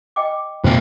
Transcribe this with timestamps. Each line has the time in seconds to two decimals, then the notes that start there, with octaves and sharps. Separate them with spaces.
0.16 D#5 G5 D6
0.64 B1 F2 A#3 C5 G5